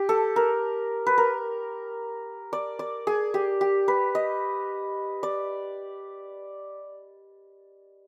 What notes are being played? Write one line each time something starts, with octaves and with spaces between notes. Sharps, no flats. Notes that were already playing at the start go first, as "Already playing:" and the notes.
Already playing: G4
A4
A#4
B4
A#4
D5
D5
G#4
G4
G4
B4
D#5
D5